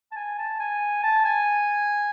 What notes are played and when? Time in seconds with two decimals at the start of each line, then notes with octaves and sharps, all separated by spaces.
0.12 A5
0.16 G#5
0.38 A5
0.60 G#5
1.03 A5
1.25 G#5